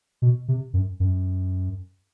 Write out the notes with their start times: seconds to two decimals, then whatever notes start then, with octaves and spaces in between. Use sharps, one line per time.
0.22 B2
0.48 C3
0.73 F#2
1.00 F#2